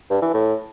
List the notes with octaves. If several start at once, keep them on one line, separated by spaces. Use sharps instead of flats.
G2
E3
A2